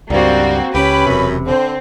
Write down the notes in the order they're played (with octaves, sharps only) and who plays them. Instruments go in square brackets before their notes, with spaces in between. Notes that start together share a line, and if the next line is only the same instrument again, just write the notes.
[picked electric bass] C#2 G2 [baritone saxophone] G3 [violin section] A#3 C4 F#4 [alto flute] D5
[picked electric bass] C#2 [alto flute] C#4 [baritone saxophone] G4 [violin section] B4 B5
[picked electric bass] E1 C3 [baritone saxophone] F#2
[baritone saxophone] D3 [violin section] C4 [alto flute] C5